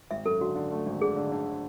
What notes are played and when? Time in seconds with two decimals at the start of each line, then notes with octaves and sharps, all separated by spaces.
0.11 G#1 E5
0.25 F#2 A4
0.40 D3 F#4
0.56 D3
0.71 A3
0.86 G#1
1.01 D3 G#4
1.16 D3
1.32 D3